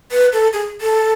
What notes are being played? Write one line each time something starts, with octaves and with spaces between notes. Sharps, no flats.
B4
A4
G#4
A4